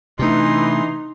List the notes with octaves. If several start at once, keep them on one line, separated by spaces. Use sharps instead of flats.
C3 E3 A3 D4 D#4 C6